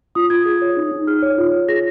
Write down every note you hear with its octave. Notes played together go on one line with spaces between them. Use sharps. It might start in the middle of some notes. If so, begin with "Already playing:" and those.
F4 D#6
F4 G#6
G#4
C#5
D#4
D#4
G#4 F6
C#5
F4
F4
G#4 A#6